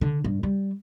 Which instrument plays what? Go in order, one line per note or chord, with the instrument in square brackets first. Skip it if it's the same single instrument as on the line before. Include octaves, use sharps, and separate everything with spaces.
[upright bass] D3
G2
G3